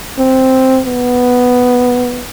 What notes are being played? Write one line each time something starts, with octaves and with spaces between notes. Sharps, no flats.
C4
B3